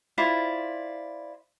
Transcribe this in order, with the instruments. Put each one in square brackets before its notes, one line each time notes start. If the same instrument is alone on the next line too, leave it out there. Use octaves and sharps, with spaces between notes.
[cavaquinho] E4 F4 C5 D5